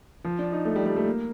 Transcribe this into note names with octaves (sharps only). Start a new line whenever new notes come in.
F3
D4
D#4
A3
G3
G3
A3
A#3